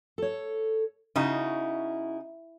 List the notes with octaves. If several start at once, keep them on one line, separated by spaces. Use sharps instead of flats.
A4 C#5
C#3 D#4 E4 F#4